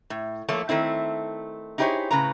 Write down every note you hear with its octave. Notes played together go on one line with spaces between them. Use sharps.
A2
F3 A3 A#3 A4 C#5
D#3 A3 C4 E4
D#4 E4 G4 G#4 C5 C#5
A2 C#3 B4 A#5